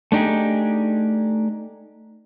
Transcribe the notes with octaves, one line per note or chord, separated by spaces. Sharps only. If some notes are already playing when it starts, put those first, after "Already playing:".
A3 D4 D#4 G4 G#4